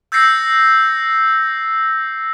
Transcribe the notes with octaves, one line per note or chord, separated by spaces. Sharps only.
E6 G6 A6 A#6 C7 C#7